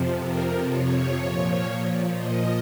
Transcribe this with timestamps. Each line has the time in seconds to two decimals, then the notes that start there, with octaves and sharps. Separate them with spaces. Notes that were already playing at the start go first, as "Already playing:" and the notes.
Already playing: F2 C3 F3
0.19 A#4
0.68 C#5
1.16 A#2 F3
2.14 D#5